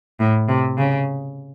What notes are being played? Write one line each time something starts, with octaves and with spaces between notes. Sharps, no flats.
A2
C3
C#3